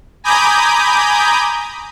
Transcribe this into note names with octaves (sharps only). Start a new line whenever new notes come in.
G#5 A#5 B5 D6 D#6 G6